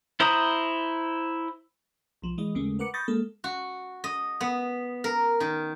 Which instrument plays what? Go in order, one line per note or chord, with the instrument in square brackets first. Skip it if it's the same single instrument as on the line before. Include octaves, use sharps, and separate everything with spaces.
[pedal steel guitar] E4 C5 A#5 D#6
[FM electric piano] B1 F3
E3 G#3 D#5
D#2 C#3 G#3 A3
A#4 B4 F#5 D6 C#7
B5 C#6 D#6 G6 A6 A#6
G#3 A#3 A4
[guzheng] F#4
D#5
B3
A#4
D#3